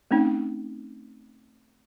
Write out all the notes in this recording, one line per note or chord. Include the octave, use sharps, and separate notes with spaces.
A3 C4 C#4 D#4